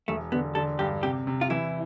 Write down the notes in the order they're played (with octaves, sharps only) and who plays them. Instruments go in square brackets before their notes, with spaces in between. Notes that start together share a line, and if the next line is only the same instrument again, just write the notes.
[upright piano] E1 [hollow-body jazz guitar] A3
[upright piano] D3 [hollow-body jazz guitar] B3
[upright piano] D3 [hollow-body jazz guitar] A4
[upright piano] G2 [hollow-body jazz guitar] G4
[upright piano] C3 [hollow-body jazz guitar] G4
[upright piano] C3
[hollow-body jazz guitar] F4
[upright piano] E3 [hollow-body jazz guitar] E4